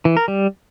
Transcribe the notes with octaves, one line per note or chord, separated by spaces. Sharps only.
E3
A#4
G3